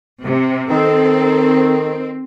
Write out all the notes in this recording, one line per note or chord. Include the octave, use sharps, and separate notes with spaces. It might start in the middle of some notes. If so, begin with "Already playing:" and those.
C3
D#3 C4 A4